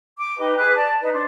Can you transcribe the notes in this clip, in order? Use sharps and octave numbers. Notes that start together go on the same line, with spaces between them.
D6
D#4 G4 B4 D#5
G#4 B4 D6 F#6
D5 A5
D#4 B4
D4 C5